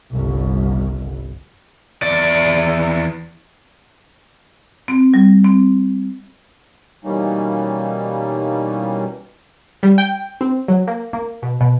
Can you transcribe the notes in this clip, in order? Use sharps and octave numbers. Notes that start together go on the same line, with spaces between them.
G1 C2
E2 D5
C4
G3
C4
B2 E3 G3 A#3 C#4 D#4
G3
G5
C4
F#3
A#3
A#3
B2
B2